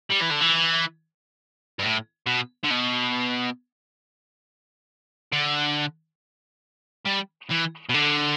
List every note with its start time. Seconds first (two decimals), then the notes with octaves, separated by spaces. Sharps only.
0.10 G3
0.20 E3
0.30 D3
0.40 E3
1.79 G2
1.83 A2
2.27 B2
2.64 D3
2.70 B2
5.32 D3
7.06 G3
7.51 E3
7.89 B2
7.94 D3